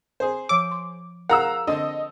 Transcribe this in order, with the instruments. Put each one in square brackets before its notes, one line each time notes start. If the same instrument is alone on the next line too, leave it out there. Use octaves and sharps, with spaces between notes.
[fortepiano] G#4 C5
[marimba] F3 C#5 E6 [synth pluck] D6
[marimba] C6
[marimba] F4 G#4 A#4 [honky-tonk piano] F5 A#5 E6 [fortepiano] F#5
[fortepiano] D3 C4 [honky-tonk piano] D#5